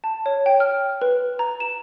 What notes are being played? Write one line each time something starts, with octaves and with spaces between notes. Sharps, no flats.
A5
C#5
G5
F6
B4
A#5
E7